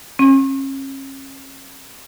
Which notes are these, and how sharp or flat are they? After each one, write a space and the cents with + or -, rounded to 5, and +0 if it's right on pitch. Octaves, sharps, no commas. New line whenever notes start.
C#4 -35